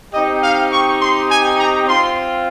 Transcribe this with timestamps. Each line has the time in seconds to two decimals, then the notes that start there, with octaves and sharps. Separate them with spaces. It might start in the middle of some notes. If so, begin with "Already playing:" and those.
0.12 C4 D#4 G4 D#5
0.42 F5
0.71 C#6
1.00 C6
1.29 G#5
1.58 A#5
1.87 C4 F4 C6